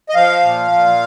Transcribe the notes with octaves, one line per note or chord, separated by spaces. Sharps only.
D#5
F3 F5
A#2
A#2